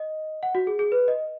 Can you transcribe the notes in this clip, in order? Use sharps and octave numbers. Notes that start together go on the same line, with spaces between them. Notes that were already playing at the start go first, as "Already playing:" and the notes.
Already playing: D#5
F#5
F#4
G#4
G#4
B4
D#5